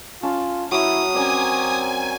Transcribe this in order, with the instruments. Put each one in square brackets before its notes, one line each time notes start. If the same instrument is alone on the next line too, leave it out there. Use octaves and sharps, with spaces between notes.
[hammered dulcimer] C#4 A5 [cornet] F4
[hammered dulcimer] F#3 C#5 [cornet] E4 [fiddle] D#6
[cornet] C4 [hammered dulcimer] C#4 A#4 D5 [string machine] G#5